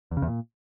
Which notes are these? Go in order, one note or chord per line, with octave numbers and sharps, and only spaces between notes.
E2
C#3
E2
A#2